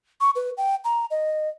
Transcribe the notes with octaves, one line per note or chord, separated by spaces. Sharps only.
C#6
B4
G5
A#5
D#5